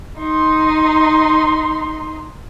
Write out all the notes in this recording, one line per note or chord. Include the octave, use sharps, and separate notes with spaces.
D#4 C6